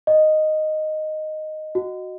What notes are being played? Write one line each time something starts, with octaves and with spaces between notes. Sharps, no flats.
D#5
F#4